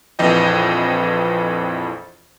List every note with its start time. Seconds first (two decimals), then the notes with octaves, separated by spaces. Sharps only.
0.19 A#1 F2 E3 D#5 G5